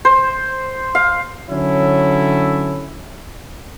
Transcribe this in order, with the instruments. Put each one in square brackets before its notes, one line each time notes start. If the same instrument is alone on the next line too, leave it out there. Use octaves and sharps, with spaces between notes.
[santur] C5
F5
[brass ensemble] D3 F#3 C#4 E4 A4